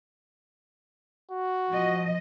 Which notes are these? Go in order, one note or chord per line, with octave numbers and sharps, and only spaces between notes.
F#4
F3 D#5